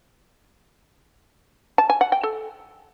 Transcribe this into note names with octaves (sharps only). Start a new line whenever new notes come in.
A5
G#5
F#5
G5
A4